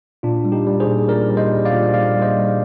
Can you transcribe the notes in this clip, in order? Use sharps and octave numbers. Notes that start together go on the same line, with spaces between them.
A#2 D4 F4
G3
D#4 G4
G3
G#4 C5
A#2
A#2 A#4 D5
G3
C5 D#5
G3
D5 F5
A#2
A#2 D5 F5
G3
C5 D#5
G3